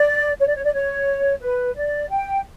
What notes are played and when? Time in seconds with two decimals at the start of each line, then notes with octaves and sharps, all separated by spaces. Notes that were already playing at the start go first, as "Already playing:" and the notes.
Already playing: D5
0.39 C#5
0.47 D5
0.55 C#5
0.64 D5
0.73 C#5
1.40 B4
1.75 D5
2.09 G5